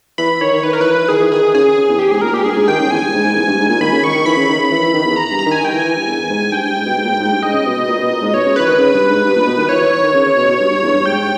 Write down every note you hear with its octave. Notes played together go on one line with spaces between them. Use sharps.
E3 B5
D#3 C#5
D#3
D#3 B4
A#4
E3 B4
E3
D#3 G#4
E3
D#3 G#4
D#3
C#3 G#4
C#3
E2
G4
G#2 G#4
A#2 A#4
A#2 G4
G2 G#4
G#2
D#3 G5
C#3
E2 G#5
G2
G#2
G#2
E2
G2
G#2
A#2
D#3 B5
C#3
D#3 C#6
D#3
E3 B5
C#3
D#3
C#3
E3
E3
D#3
E2
A#5
G2
A#5
D#3
G#5
D#3 G5
E3
G#5
E3
G2
E2
G#2
G2 G5
G2
G#2
B2
G#2
A#2
G#2
G#2
G2
G#2 D#5
C#3
B2
B2
A#2
B2
A#2
G#2
B2 C#5
C#3
E3 B4
D#3
C#3
G2
G#2
G2
A#2
B2
D#3
E3 C#5
E3
D#3
C#3
C#3
B2
B2
G2
G2
E2
G2
G#2 G5